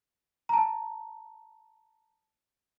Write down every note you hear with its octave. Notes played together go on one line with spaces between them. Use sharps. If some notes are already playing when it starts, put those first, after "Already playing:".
A5 A#5